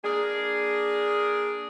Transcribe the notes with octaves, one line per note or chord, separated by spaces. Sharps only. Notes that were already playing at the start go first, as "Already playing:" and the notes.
A#3 D4 G#4